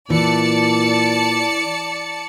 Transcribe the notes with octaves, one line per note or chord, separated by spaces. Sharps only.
A#2 E3 D5 A5 C#7